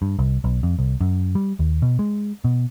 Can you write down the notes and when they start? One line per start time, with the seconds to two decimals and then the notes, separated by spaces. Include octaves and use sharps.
0.02 G2
0.19 C2
0.44 B1
0.63 F2
0.79 C2
1.01 F#2
1.35 G3
1.59 D#2
1.82 B2
1.99 G#3
2.44 B2